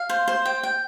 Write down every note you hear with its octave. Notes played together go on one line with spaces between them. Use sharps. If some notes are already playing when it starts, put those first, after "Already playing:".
Already playing: F5
C5
C5
G5
G5